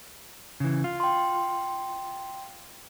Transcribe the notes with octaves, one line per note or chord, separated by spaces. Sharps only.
C#3 E3
F4
G5 C6